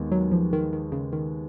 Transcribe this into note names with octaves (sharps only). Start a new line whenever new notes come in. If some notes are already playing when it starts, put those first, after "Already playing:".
Already playing: D#2 D#3 G#3 B3
F#3
F3
D#3
D#3
C#3
D#3